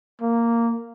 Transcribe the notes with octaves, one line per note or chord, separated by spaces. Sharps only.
A#3